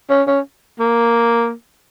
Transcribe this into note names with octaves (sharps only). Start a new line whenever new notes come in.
C#4
C#4
A#3